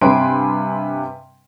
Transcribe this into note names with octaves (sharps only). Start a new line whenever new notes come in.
G2 C3 B4 G#5 C6 D7